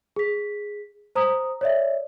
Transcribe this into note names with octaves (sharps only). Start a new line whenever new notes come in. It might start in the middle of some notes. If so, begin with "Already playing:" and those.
G#4 B6
C5 A#5 D#6
C#5 D5 E5